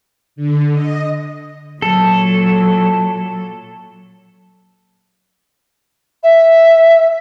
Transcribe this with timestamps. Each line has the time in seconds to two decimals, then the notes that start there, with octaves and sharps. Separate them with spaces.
0.36 D3
0.72 D#5
1.82 A#2 F#3 A4
6.23 E5